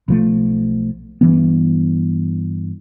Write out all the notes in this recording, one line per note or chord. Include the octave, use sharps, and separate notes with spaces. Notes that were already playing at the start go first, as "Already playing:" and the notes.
B1 F3 A3
G2 E3 B3